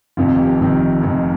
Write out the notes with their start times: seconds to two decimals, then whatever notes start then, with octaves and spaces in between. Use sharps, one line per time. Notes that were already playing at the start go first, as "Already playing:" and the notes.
0.17 F1 F2 C3 D#3 F4
0.38 G4
0.60 F1 F2 C3 D#3
1.03 F1 F2 C3 D#3